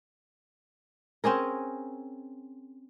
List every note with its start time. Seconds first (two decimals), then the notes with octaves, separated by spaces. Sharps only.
1.24 C4 C#4 G#4 A#4